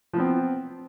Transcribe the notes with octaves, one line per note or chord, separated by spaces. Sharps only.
F3 B3 C4